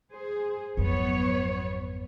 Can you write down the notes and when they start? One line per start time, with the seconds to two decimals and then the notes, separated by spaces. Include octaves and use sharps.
0.12 G#4 C5
0.77 G#1 F2 F#3 B3 C#5